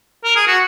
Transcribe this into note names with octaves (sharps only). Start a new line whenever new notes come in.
A#4
G#4
F#4